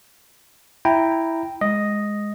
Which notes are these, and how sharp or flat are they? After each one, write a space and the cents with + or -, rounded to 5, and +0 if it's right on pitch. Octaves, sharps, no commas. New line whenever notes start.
E4 +0 G5 +0 A#5 -5
G#3 +0 D#5 +0